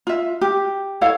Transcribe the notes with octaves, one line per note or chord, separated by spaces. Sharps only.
F4 E5
G4
E4 A4 C#5 F5